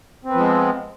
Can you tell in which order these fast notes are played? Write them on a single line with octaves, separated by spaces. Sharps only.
C4 B3 F3 G#3